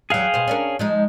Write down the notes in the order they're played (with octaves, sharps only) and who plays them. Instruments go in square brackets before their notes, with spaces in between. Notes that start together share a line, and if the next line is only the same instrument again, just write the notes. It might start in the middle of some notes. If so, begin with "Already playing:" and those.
[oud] E2 F#3 [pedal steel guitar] G#4 F5 G5
[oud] B2 C5
C#4 D4 A#4
F3 G#3 D#4